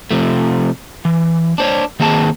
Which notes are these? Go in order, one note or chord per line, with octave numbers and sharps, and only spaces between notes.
C3 F3 A3
E3
D4 C5 C#5
D#3 A#3 C4 G#4 A5